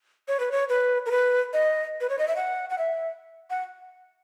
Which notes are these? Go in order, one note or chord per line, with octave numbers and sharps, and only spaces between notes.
C#5
B4
C#5
B4
A#4
B4
D#5
B4
C#5
D#5
E5
F#5
F#5
E5
F#5